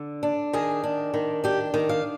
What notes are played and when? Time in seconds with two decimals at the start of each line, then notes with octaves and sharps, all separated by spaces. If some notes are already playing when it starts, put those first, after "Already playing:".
Already playing: D3
0.23 D4
0.53 D#3 G#4
0.83 D4
1.14 D#3
1.44 D4 G4
1.74 D#3
1.89 F5